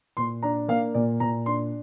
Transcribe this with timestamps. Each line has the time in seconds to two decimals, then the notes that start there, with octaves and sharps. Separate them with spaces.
0.17 A#2 C6
0.43 D4 A#5
0.68 A#3 F5
0.94 A#2 D5
1.20 A#2 A#5
1.46 D4 C6